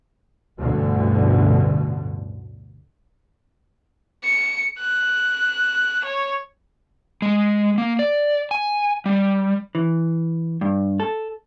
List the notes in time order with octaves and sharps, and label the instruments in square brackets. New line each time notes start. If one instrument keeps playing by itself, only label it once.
[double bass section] A1 D2 G2 B2 D3
[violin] C#7
F#6
C#5
[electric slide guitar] G#3
A#3
D5
G#5
G3
[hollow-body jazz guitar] E3
G2
A4